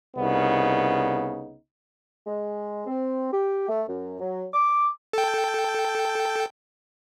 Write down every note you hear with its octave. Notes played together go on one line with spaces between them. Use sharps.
C2 C#3 B3 D#4
G#3
C4
G4
A3
F#2
F#3
D6
A4 G5